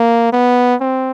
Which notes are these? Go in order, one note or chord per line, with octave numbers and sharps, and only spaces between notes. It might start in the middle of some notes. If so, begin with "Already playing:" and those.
Already playing: A#3
B3
C4